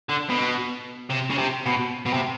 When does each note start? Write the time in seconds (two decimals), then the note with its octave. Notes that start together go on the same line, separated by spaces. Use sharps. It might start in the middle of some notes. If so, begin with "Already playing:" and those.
0.09 D3
0.29 B2
1.10 C3
1.30 C#3
1.38 C3
1.66 B2
2.06 B2
2.14 C3